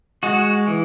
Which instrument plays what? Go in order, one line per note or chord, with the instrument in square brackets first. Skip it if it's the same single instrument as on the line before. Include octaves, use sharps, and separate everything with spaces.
[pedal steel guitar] G#3 F#4
E3